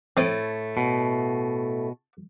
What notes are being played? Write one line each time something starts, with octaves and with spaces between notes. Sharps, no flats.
A2 A3 C4
B2